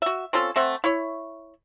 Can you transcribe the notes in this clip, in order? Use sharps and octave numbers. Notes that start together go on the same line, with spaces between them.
F#4 E5
C4 C#4 F4 A4
A3 C4 E5 F#5
E4 C#5